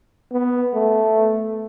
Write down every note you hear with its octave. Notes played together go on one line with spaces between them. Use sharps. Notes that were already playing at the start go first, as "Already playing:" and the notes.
B3
A3